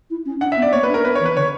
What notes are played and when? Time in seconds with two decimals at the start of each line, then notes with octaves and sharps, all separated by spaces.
0.10 E4
0.26 C#4
0.41 D4 F#5
0.52 E5
0.57 B3
0.62 D5
0.73 A#3 C#5
0.83 B4
0.89 D4
0.94 A#4
1.05 B3 B4
1.15 C#5
1.20 E3
1.25 B4
1.36 D3 C#5